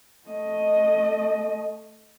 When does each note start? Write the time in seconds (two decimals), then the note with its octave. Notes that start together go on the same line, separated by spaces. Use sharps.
0.28 A3 D#5